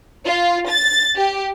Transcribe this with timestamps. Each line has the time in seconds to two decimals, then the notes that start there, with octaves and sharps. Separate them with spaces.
0.25 F4
0.69 A6
1.15 G4